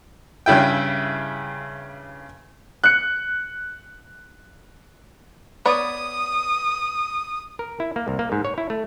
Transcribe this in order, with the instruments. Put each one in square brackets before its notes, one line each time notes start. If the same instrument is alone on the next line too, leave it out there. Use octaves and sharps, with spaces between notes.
[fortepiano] G2 C#3 E4 G5
[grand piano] F#6 C#7
[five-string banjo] B3 C#5 D5 [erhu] D#6
[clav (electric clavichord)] A#4
E4
A#3
C2
A#3
G#2
C#5
E4
A3